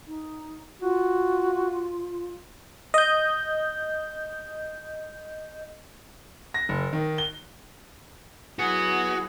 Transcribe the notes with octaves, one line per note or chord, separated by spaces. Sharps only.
D#4
F4 F#4
D#5 G6
A#6
F#1
D#3
G7
F#3 B3 E4 F#4 G#4